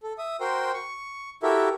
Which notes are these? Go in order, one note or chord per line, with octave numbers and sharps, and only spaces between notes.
A4
E5 D#6
F#4 A#4 C5 G5 C6
C#6
E4 F#4 G4 A4 A#4 E5